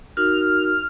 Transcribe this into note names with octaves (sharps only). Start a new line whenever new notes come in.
D#4 F#4 A#4 F6